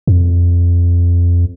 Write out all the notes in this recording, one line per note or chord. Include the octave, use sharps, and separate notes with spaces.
F2